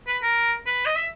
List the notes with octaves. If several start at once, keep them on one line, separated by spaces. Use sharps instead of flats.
B4
A#4
B4
D#5
E5